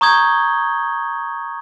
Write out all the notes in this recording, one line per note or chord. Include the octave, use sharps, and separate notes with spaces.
A#5 C#6 D#6 G6 G#6 G7